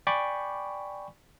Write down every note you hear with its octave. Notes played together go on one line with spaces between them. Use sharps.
D5 G5 G#5 B5 C#6 D6